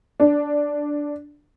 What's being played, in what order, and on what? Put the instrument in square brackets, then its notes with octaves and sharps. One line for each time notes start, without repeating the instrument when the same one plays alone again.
[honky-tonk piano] D4